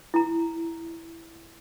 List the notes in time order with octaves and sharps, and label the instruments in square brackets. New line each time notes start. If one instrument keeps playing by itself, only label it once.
[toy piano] E4 A#5